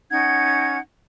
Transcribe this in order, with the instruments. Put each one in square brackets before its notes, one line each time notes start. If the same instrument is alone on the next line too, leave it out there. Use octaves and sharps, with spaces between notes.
[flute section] C#4 D#4 F#5 G#6